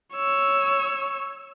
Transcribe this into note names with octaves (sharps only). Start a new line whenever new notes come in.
C#5 E6